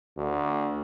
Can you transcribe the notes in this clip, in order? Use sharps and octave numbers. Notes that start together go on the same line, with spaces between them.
D2